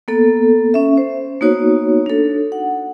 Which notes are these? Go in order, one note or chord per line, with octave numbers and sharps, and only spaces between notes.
A#3 B3 A4
C#4 E5
C5
A#3 B3 D#4 F#4 C#5
D4 A4
F#5